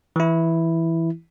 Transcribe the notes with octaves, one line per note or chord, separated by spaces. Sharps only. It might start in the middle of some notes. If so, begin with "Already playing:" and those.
E3 E4